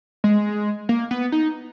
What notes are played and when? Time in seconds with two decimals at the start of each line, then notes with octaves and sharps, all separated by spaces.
0.24 G#3
0.89 A#3
1.11 B3
1.32 D#4